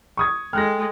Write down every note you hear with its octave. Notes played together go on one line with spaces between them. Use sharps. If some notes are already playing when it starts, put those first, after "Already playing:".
C#6 D#6 G#6
G#3 A4 G5 F6 F#6 A#6